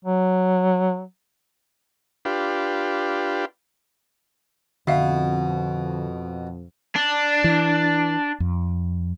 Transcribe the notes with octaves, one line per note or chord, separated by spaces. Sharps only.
F#3
D4 F4 G4 B4
F2 B2 D3 E5 F5
D4
E3
F2